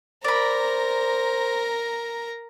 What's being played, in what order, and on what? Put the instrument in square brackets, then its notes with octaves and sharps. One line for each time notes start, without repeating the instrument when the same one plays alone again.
[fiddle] A#4 A#5 [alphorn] C5 [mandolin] D5 B5